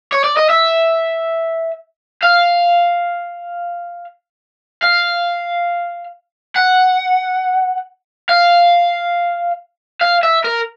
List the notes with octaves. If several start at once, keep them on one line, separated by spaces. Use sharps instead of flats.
C#5
D5
D#5
E5
F5
F5
F#5
F5
F5
E5
A#4